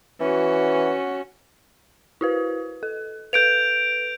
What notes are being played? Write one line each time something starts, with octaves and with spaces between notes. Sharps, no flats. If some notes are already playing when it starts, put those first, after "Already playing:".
E3 C#4 F#4
E4 F#4 B4
A4
A4 B4 G6 D7 F7